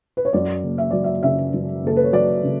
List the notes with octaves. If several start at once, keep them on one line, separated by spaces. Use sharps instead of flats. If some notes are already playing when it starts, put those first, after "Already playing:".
B4
C#5
F#2 D5
F#1
E5
F#3 D5
E5
C#3 E5
F#2
F#1 A4
B4
C#5
F#3 D5
C#3